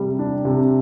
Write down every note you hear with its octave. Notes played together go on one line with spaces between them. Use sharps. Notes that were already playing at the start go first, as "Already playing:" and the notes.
Already playing: C3 G3
D4
C3